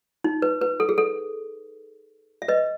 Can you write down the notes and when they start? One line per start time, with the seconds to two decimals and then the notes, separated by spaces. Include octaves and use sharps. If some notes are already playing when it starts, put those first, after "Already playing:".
0.24 D#4
0.42 B4
0.61 B4
0.80 A4
0.89 G#4
0.98 A4
2.42 E5
2.48 B4 D#5